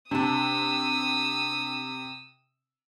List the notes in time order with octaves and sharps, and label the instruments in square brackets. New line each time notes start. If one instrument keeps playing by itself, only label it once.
[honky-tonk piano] C3 [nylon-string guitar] D4 A5 [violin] D#6 E6